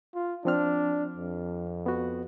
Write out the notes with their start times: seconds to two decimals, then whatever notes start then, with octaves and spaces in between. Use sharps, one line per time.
0.15 F4
0.45 F3 C4 D4 F6
1.16 F2
1.86 B3 F#4